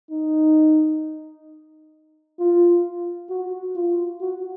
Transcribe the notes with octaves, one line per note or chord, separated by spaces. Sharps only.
D#4
F4
F#4
F4
F#4